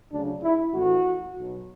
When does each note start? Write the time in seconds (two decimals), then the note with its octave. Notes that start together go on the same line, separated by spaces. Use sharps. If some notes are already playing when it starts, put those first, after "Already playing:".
0.11 D2 C#3 F#3 D4
0.43 E4
0.73 A1 A2 E3 F#4
1.36 B1 B2 F#3